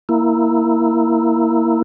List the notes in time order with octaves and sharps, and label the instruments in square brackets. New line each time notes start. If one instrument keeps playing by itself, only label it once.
[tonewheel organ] A#3 E4